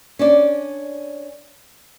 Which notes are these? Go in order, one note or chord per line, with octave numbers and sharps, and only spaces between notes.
C#4 D4 D5